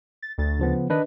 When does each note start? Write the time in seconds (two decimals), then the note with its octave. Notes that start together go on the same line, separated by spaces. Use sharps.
0.22 A6
0.38 D2 A6
0.59 C#3 F3 B3
0.90 D#3 D4 B4 D#5